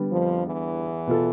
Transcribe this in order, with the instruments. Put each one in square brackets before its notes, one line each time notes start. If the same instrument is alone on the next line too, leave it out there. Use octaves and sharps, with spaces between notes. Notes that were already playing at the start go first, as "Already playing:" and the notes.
Already playing: [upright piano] D3 G3 B3
[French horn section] F2 F3
E2 E3
[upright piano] B2 B3 F4 A4